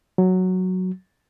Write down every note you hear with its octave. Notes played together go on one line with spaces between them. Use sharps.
F#3